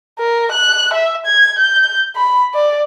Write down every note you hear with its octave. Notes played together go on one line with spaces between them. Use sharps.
A#4
F#6
E5
G#6
G6
B5
D5